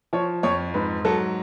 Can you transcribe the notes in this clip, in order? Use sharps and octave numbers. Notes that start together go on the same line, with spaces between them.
F3 C#5
F2 C#5
G#2 B4
F#3 A4